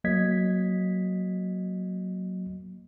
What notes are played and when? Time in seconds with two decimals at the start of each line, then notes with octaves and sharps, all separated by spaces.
0.04 F#3 A#3 D#5 G#6 B6